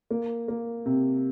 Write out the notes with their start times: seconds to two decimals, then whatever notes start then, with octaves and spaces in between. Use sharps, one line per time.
0.11 A#3
0.48 A#3
0.86 C3